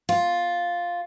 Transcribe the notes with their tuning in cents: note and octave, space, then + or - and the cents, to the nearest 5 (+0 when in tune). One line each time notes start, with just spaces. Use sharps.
F4 +5